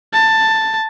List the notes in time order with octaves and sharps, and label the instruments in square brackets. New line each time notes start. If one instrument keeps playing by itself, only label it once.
[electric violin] A5